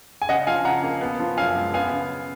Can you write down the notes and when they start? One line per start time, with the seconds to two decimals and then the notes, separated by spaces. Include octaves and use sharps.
0.22 G#5
0.29 C#3 D#5 F#5
0.47 F3 F5 G#5
0.65 C#3 F#5 A#5
0.84 A#3
1.01 B3
1.20 F3
1.37 F#2 F5 G#5
1.56 G#3
1.74 B3 F5 G#5
1.92 C#3